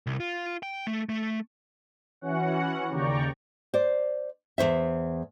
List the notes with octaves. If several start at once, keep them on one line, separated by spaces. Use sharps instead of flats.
C2
F4
G5
A3
A3
E3 C#4 F#4 F#5
D#2 C#3 D5 G5 A#5 C#6
C5 D5
E2 C#3 C5 E5